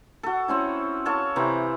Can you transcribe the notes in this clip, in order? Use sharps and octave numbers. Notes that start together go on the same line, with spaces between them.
F#4 A4
C4 C#4 E4
A4 C#5 F5 A5
C3 E3 C4 A#5